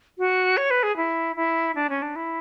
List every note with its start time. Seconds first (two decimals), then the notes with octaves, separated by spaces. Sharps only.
0.18 F#4
0.57 C#5
0.70 B4
0.83 G#4
0.96 E4
1.36 E4
1.75 D4
1.89 C#4
2.02 D4
2.16 E4